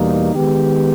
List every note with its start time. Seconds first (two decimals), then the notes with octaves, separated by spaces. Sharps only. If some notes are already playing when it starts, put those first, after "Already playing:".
Already playing: E2 B2 G3 A#3 D#4
0.33 D#3 G#3 B3 G4